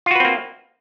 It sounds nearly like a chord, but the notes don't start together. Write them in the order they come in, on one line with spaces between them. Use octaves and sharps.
F4 F#4 B4 C4 A#3